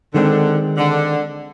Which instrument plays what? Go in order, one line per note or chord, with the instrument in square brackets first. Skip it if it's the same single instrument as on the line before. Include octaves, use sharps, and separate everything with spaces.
[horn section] D3 [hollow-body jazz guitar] D#3 G#3 C4
[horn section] D3